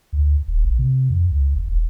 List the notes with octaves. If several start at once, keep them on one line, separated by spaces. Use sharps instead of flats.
D2
D#1
A#1
C3
F2
C#2
F#1
E1